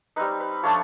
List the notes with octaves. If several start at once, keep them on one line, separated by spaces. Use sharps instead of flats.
G3 C4 D#4 B4
B4
F3 A3 D4 F4 C#5